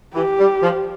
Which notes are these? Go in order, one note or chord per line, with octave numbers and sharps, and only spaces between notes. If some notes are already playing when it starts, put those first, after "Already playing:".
E3 G4
G3
F3